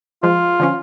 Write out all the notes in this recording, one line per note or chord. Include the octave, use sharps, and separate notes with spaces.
F3 G#3 F4
D3 F3 C#4